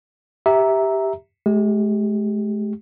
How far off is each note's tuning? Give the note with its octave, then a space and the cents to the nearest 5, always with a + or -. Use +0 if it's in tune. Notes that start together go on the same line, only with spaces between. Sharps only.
G4 +0 E5 -10 A#5 +0
G#3 +45 G4 +0